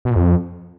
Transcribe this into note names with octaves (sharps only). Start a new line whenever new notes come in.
B2
A#2
F2